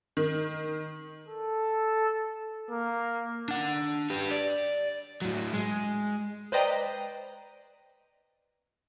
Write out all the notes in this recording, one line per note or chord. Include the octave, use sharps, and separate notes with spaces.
D#3
A4
A#3
D4 F#5
G4 B4
D5
A2 F#3
G#3
B4 C5 D5 D#5 G5 A#5